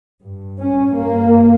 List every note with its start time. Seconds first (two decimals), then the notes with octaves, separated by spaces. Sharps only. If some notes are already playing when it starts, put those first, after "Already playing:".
0.24 G2
0.61 C#4
0.96 G2 A#3